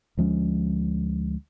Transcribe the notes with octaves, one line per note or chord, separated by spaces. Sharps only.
D2 F3 G#3 C#4